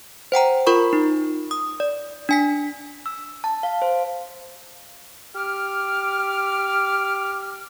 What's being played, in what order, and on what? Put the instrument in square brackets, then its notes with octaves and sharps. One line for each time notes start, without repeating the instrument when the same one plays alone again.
[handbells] C5 F#5 G5 A#5
F4 A#4 B5 C#6
D#4
D#6
D5
D4 G#5 B6
[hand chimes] E6
A5
F5
C5
[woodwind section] G4 D6 F6